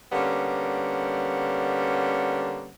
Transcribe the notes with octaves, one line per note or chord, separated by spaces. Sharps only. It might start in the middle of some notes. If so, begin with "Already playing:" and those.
D3 G3 A#3 B3 C#4